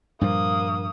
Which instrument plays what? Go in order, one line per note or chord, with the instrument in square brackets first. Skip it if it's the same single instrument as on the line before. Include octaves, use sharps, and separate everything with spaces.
[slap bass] G2 A#2 F3 [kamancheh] A#3 D#6